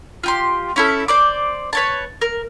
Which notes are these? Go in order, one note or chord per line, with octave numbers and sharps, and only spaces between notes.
F4 G4 C6
C#4 E4 A4
C5 D5 D6
B4 C#5 A5
A#4